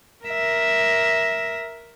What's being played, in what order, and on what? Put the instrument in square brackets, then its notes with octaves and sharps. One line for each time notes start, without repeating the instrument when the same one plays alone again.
[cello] A#4 E5